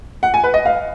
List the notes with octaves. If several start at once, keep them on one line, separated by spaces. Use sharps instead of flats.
F#5
G#5
B4
D#5
F5